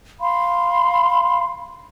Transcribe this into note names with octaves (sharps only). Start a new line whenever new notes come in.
F5 B5 C6